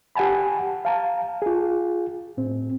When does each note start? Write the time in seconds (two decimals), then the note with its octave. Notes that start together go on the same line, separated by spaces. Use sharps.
0.16 G4 F#5 G#5 A5 B5
0.85 F5 A5 A#5
1.42 F4 G#4
2.37 A2 C4